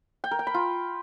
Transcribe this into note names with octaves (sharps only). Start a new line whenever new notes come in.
G5
A#4
G5
B5
F4